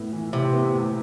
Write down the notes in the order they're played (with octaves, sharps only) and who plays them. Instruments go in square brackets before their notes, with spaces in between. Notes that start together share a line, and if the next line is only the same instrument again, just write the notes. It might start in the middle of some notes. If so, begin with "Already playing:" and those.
Already playing: [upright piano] A2 B3
E3
[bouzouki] C3 [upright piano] E4
[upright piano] B3
A2